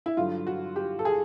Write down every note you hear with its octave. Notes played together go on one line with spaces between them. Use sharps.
E4
G2 D3 F#3 F4
F#4
G4
A4
G#4